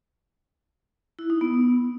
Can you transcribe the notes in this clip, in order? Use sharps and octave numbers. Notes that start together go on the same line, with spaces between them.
E4
D#4
B3